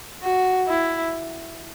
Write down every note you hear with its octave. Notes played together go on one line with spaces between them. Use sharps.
F#4
E4